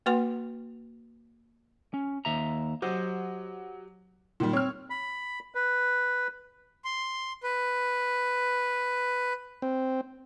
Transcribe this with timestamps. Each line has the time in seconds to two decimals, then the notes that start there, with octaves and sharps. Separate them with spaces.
0.06 A#3 F#4 B4 F#5 C6
1.94 C#4
2.25 D#2 E5 A#5
2.82 F#3 G4 C5 D#5
4.40 A#2 D#3 G3
4.53 C4 C#5 F6
4.90 B5
5.55 B4
6.85 C6
7.43 B4
9.62 C4